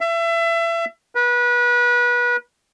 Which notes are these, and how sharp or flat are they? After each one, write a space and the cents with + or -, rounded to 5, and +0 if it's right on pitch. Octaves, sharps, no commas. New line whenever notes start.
E5 +30
B4 -30